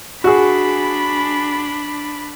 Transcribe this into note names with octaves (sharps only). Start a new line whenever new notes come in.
D4 F#4 G#4 B5